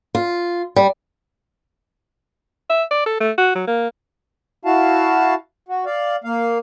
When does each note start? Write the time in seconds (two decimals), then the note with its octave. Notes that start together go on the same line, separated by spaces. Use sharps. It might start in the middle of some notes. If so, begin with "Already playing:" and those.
0.15 F4
0.76 G3
2.70 E5
2.91 D5
3.06 A4
3.20 A3
3.38 F#4
3.55 F#3
3.67 A#3
4.65 E4 F#4 F5 A5
5.69 F#4
5.86 D5 F5
6.24 A#3 F5